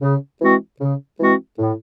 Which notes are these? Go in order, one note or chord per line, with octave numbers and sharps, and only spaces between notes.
C#3
E3 G#3 C4 F#4
C#3
E3 G#3 C4 F#4
A2